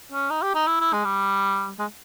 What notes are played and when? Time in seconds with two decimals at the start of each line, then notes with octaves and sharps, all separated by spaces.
0.12 C#4
0.31 D#4
0.43 G4
0.55 D#4
0.67 E4
0.80 E4
0.93 G#3
1.05 G3
1.79 G#3